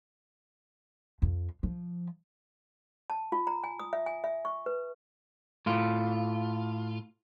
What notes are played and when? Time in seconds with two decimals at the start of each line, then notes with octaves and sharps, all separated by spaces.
1.22 F2
1.63 F3
3.10 A5
3.32 F4
3.47 A#5
3.64 G#5
3.79 D#6
3.93 E5
4.06 G#5
4.24 E5
4.45 C#6
4.66 B4
5.66 A2 F4